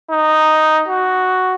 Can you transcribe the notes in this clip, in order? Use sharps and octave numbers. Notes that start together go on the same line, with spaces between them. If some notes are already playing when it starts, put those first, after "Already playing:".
D#4
F#4